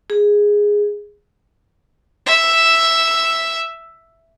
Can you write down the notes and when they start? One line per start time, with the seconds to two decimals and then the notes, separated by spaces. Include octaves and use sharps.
0.10 G#4
2.26 E5 E6